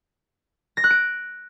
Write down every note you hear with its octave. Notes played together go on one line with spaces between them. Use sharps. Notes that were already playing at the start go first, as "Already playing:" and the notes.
A#6
F#6
D7